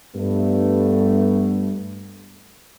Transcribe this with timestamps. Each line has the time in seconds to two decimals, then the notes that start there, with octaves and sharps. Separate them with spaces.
0.16 G2 A3 B3